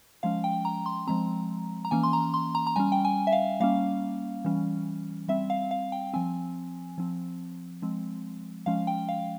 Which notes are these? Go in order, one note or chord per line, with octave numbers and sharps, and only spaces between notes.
F3 G#3 C#4 F5
G5
A#5
C6
F3 G#3 C4 A#5
A#5
E3 A#3 C#4 G#5
C6
A#5
C6
A#5
A#5
G3 C#4 G#5
G5
G#5
E5
F5
G3 A#3 C#4 F5
E3 G3 C#4
G3 C4 E5
F5
F5
G5
F3 C4 G#5
F3 C4
F3 G#3 C4
F3 G#3 C#4 F5
G5
F5